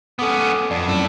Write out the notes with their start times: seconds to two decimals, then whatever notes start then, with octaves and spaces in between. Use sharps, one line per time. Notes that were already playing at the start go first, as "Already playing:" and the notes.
0.19 B3 C#4 A4 D6 D#6
0.71 F2 D5
0.88 F#2 E4 A4